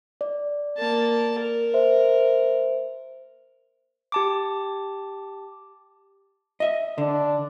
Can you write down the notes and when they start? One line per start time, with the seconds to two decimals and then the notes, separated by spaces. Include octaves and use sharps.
0.21 D5
0.78 A#3 A5
1.40 A#4
1.74 C5 E5
4.12 G4 A5 D6
6.60 D#5 E5
6.98 D3 D4